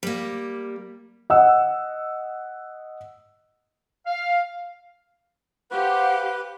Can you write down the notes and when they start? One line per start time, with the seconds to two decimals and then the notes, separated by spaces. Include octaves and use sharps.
0.03 G3 A#3
1.30 D#5 F#5 E6
4.07 F5
5.71 G4 B4 C5 F5 F#5